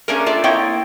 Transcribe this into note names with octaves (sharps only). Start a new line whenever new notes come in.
A3 A#3 C#4 D4 G#4 A#4
D4 F4 A4 D5 E5
A#3 C4 E4 C#5 D#5 G5